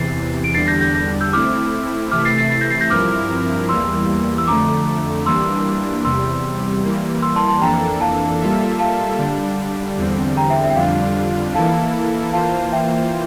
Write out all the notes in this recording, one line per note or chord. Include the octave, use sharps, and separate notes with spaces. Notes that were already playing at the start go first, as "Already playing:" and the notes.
Already playing: E2 C3 E3 A6 C7
D7
E2 D3 G3 D4 A6 C7
G6 A#6
G6 A#6
G6 A#6
E6 G6
A3 C4 E4 D6 F6
C3 E3 A3 E4 D6 F6
A6 C7
A6 C7
A6 C7
G6 A#6
A6 C7
G6 A#6
G2 F3 C4 E4 A#4 D6 F6
E2 E3 G3 A#3 C6 E6
E6
F2 D3 A3 A#5 D6
E3 G3 A#3 D4 C6 E6
E2 C3 G3 C6 E6
E3 G3 A#3
C6 E6
A5 C6
A5 C6
F2 E3 A#3 D4 A4 G5 A#5
F5 A5
G3 A#3 F4 A4 E5
F5 A5
D3 G3 D4
E2 D3 G3 C4
G5 A#5
E5 G5
E5
G5
F2 D3 G3 D4 F4 F5
E3 A#3 E4 A4 F5 A5
E3 A#3 F4 C5 F5 A5
E5 G5